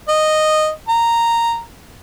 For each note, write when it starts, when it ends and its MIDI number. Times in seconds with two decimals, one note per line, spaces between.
0.08 0.70 75
0.89 1.60 82